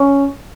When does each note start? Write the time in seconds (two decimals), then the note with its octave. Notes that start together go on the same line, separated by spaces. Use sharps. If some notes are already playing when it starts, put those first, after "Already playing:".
Already playing: C#4